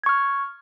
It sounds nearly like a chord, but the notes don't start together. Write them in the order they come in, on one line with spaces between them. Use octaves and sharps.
G#6 C#6 F6